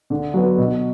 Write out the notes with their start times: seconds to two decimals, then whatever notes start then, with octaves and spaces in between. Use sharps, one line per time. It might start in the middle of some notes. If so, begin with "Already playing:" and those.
0.10 D3
0.34 F#3 B3
0.58 B2